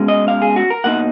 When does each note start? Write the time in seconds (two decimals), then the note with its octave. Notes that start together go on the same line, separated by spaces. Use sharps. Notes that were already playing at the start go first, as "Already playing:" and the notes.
Already playing: B2 G#3 C#4
0.08 D#5
0.28 F5
0.42 G#4
0.56 F#4
0.70 A#4
0.84 B2 A#3 D#4 F#5